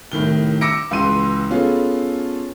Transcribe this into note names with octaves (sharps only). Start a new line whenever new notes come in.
C2 A2 D#3 G7
D6 E6 A#6 C#7 D7
C#2 E3 C6 D#7
B3 C#4 F4 G#4 A4